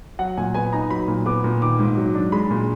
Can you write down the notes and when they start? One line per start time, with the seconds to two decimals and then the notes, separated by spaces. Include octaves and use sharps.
0.19 F#3 F#5
0.37 A#2 G#5
0.54 B3 G#5
0.73 D#4 A#5
0.90 F#3 B5
1.08 A#2
1.26 B3 D6
1.44 A#2
1.61 D#3 D6
1.79 G#2
1.97 F#3
2.15 D4
2.32 G#3 B5
2.51 A#2